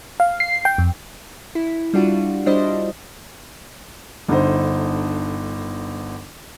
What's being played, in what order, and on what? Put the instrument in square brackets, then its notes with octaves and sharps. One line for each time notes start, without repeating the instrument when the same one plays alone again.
[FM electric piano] F5
C7
G5
F2
[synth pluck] E4
G3 D4 F4 F#4
G3 D4 E4 C5 D#5
[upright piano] G1 D3 D#4 C5